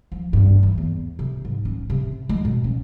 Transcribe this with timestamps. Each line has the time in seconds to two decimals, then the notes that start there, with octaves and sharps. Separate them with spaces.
0.12 F3
0.33 G2
0.63 E3
0.78 E2
1.19 C3
1.45 G#2
1.65 C#4
1.90 C3
2.29 G#3
2.45 B2
2.64 C#4